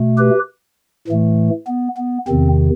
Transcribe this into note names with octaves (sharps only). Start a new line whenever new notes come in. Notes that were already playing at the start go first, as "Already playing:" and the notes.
Already playing: B2 A3
G4 B4
A2 E3 A3
B3
B3
E2 C3 D#3 C4